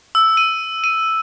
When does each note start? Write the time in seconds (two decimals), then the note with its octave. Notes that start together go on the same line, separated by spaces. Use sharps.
0.15 E6
0.37 D#7
0.84 D#7